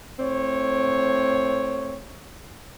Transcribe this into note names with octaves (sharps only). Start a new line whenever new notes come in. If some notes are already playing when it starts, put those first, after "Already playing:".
A2 C4 C#5